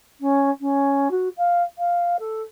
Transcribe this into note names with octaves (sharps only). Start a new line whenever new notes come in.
C#4
C#4
F#4
F5
F5
A4